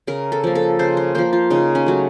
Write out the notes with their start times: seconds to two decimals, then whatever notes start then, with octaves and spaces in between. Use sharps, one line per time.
0.07 C#3 A#4
0.32 A4
0.44 F3 A#3
0.55 A4
0.79 C#3 C5
0.97 C5
1.15 F3 A#3 C5
1.33 F4
1.50 C#3 D#4
1.75 C#4
1.86 F#3 A3